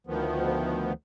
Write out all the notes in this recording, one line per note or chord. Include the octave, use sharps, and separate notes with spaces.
D2 D#3 F3 B3